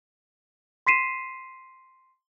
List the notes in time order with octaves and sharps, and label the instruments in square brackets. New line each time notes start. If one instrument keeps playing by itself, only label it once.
[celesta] C6 B6 C7 D#7 E7